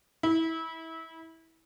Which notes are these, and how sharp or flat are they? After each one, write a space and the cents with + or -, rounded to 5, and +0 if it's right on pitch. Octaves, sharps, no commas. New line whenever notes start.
E4 -25